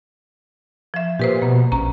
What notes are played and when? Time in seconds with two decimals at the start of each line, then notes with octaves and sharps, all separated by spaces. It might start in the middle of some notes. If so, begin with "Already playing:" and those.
0.94 F3 E5
1.19 A#2 G4 B4 C5
1.42 B2 A#3
1.72 A#1 C#4 A#5